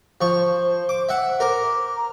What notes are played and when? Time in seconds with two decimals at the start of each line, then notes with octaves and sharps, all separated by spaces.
0.21 F3 C5 C#6
0.89 D6
1.09 E5 F#5
1.40 A#4 C5 D6
1.96 A#5